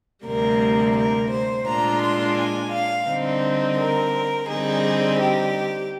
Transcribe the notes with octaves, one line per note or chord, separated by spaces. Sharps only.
D2 C3 G3 A#3 A#4
A#4
C5
A#2 G#3 D4 F4 A#5
C6
G#5
F5
D3 G3 C4 D#4
A#4
D3 G3 C4 D#4 G#4
G4